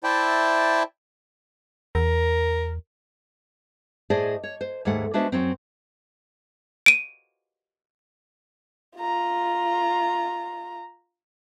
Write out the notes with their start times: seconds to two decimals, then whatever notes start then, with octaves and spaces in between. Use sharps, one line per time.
0.04 E4 C5 D5 E5 G5 A5
1.95 E2 A#4
4.10 A2 G#4 C5 D5 D#5 A5
4.44 C#5
4.61 C5
4.85 D#2 G#2 G#3 A3 F#5
5.14 G#3 B3 D4 F#4 C5 E5
5.32 F#2 B2 F#3 C4
6.86 D7 D#7
8.97 F4 A#5